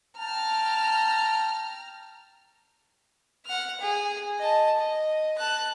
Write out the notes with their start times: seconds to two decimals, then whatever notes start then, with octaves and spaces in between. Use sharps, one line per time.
0.18 G5 A5 A#5 F6
3.46 F#5 F6
3.80 G#4
4.39 D#5 A5
4.77 D#5
5.38 A5 F#6